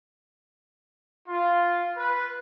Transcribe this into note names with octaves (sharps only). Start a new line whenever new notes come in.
F4
B4